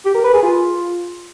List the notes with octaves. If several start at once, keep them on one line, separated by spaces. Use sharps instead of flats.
G4
A#4
B4
G#4
F4